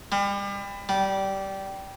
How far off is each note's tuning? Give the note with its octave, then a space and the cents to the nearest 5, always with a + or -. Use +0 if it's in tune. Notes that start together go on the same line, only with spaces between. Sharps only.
G3 +35
G3 -15